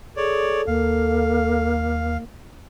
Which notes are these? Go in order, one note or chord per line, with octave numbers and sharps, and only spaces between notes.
G#4 A4 C#5 D5
D#2 A#3 F5